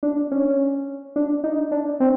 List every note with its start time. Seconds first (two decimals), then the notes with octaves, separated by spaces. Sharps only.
0.03 D4
0.32 C#4
1.16 D4
1.44 D#4
1.71 D4
2.00 C4